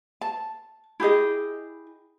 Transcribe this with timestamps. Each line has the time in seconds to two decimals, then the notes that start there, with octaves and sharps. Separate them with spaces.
0.21 A5
1.00 E4 G4 G#4 D#5